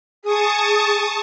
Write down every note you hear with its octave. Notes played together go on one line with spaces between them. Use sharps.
G#4 A5 C#6 D#6